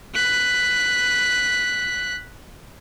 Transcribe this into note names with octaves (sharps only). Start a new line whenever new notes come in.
F#6 B6